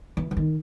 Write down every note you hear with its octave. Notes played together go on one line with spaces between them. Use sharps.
E3
E3
D#3